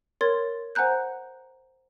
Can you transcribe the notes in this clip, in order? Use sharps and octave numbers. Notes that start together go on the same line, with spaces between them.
A#4 C#5 C6 G#6 A6
C5 F#5 G#5 A#5 F#6 G6